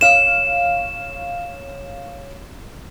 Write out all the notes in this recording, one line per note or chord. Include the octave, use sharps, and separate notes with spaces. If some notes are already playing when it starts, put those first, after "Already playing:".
C#5 F5 E7